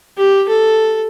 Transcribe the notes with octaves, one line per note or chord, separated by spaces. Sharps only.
G4
A4